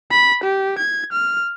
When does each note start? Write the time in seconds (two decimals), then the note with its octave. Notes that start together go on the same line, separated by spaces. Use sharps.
0.11 B5
0.43 G4
0.78 G#6
1.12 F6